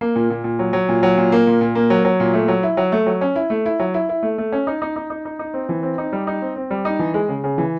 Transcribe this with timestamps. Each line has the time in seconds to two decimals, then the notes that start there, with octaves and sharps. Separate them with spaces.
0.01 A#3
0.16 A#2
0.30 A#2
0.44 A#2
0.59 F#3
0.73 F#3
0.89 A#2
1.03 F#3
1.18 A#2
1.32 A#3
1.47 A#2
1.61 A#2
1.75 A#3
1.90 F#3
2.05 F#3
2.20 A#2
2.34 A3
2.48 F#3
2.63 E4
2.77 F#3
2.92 A3
3.07 F#3
3.21 C#4
3.35 E4
3.50 A3
3.66 E4
3.79 F#3
3.94 E4
4.09 E4
4.23 A3
4.38 A3
4.52 C#4
4.67 D#4
4.82 D#4
4.96 D#4
5.10 D#4
5.25 D#4
5.39 D#4
5.54 C4
5.69 E3
5.83 C4
5.98 D#4
6.13 G3
6.27 D#4
6.42 C4
6.56 C4
6.71 G3
6.85 D#4
6.99 E3
7.14 G#3
7.29 C#3
7.44 C#3
7.58 E3